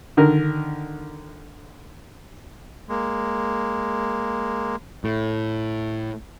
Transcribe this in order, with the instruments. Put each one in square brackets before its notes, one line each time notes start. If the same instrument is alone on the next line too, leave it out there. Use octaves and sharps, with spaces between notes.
[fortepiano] D3 D#3 A#4
[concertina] G#3 A#3
[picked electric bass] A2